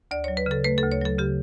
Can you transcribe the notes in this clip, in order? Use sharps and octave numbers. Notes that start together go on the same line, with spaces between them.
D2 D5
F#3 C#5
B4
C#3 A4
A3 B4
D2 A4
C#5
F#3 A4
C#3 G4